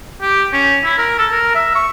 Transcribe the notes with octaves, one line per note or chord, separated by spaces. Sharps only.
G4
C#4
E4
A#4
A4
A#4
E5
C#6